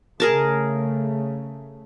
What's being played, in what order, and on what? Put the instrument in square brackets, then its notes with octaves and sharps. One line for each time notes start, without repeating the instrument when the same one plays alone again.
[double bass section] C#3 A3 [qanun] G#4 A#4 A5